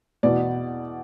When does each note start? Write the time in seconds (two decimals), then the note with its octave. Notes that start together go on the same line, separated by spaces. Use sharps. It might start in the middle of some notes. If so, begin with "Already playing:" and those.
0.23 E2 B2 B3 D5